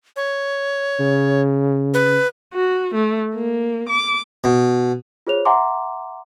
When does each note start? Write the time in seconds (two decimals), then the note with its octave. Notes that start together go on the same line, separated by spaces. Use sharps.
0.16 C#5
1.00 C#3
1.94 B4
2.54 F#4
2.94 A3
3.34 A#3
3.89 D6
4.44 B2
5.27 F4 G#4 C5 C#5 F7
5.45 E5 F#5 G#5 A#5 C6 D6